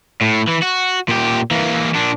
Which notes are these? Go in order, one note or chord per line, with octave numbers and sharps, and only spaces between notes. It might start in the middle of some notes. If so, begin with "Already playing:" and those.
A2
E3
F#4
A#2 G4
E3 A#3
A#2 D4